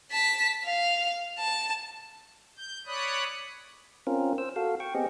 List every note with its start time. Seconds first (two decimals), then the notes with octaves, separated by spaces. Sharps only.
0.11 A5 B6
0.64 F5
1.39 A5
2.57 G6
2.87 C#5 D5 B5 D#6 F#6
4.07 C4 C#4 F4 A#4
4.38 C5 E6
4.56 F#4 A4 F5
4.80 G5 C#6
4.95 B3 C4 G4 G#4 D#5